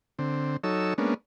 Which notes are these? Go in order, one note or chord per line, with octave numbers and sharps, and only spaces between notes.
D3 C4
F#3 D#4 A4 C#5 E6
G#3 A#3 B3 C#4 D4